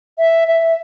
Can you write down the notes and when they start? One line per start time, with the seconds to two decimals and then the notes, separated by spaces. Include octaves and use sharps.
0.18 E5
0.48 E5